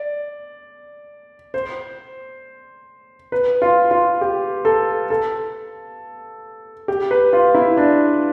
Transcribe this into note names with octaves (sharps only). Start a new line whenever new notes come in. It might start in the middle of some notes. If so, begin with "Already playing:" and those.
Already playing: D5
C5
B4
F4
F4
G4
A4
A4
G4
B4
F4
E4
D4